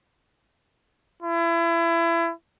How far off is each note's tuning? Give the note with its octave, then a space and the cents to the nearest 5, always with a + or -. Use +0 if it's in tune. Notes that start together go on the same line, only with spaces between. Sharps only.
E4 +30